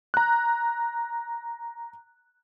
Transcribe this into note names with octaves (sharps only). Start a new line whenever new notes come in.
A#5 F#6